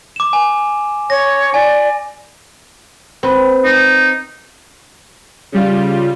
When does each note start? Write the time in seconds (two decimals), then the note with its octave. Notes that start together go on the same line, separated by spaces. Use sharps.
0.16 D6 E7
0.33 G#5
1.10 C#5 A#6
1.54 D5 G#5
3.23 C4 B4
3.64 D#4
5.52 C#3 G3 F4